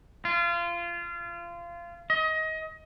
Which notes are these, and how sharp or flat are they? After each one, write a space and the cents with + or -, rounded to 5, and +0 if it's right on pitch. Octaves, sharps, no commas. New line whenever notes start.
F4 -25
D#5 +25